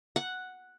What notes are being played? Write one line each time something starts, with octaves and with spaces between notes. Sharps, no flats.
F#5